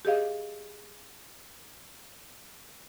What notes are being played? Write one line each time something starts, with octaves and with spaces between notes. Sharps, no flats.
G4 G#4 D#5 F5